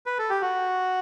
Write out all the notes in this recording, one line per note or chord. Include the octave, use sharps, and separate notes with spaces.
B4
A4
G4
F#4